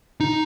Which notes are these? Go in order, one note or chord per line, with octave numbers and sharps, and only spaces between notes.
D#4